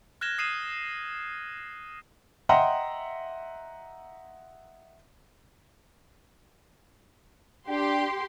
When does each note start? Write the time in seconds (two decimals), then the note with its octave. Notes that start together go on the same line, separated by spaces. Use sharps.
0.21 F6 F#6 G#6 A#6 E7 G7
0.38 D#6 C7 D#7 E7
2.49 D#5 E5 F#5 G5 A#5 C6
7.69 D4 G4 C6